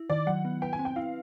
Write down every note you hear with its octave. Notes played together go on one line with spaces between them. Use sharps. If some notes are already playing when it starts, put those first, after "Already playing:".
Already playing: E4
D#3 D5
F#3 F#5
B3
B4 G5
G#5
C4
G5
E4 F5